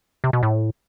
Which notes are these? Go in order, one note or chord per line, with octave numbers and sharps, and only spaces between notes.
C3
B2
A2